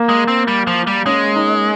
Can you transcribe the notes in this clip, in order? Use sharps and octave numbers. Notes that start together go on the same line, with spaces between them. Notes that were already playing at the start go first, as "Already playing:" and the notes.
Already playing: A#3
G#3
C4
G3
F3
G3
G#3 C#4
D#4